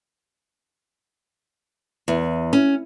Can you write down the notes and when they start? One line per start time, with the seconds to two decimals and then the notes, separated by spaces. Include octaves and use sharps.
2.08 E2
2.53 C#4